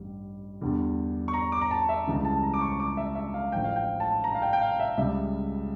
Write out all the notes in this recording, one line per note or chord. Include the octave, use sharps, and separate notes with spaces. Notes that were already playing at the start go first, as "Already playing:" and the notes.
Already playing: A1 G2 G3
E2 D3 G3
C#6
A#5
D6
A#5
A5
E5
C#2 C#3 E3 G3
A5
A#5
D6
C#6
D6
E5
E5
F5
A1 A2 F3 G5
F5
G5
A5
A#5
F5
G5
G5
F5
E5
C#2 C#3 G3 E5